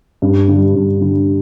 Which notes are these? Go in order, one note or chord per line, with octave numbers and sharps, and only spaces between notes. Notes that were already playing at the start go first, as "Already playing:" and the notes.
G2
D3 G3
G2
D3 G3